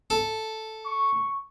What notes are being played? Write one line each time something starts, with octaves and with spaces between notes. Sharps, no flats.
A4
C#6